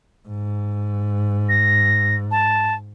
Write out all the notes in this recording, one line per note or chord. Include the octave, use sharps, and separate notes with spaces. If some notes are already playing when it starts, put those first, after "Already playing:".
G#2
A#6
A5